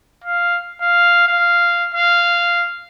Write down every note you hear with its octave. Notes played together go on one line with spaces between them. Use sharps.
F5
F5
F5
F5